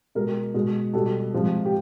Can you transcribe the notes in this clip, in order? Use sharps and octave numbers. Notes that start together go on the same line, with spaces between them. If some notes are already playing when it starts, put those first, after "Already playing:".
B2 G#3 A#4
B2 G#3
B2 G3 A4
C3 F3 G#3
G4